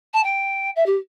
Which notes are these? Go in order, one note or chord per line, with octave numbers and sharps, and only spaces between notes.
A5
G5
E5
G4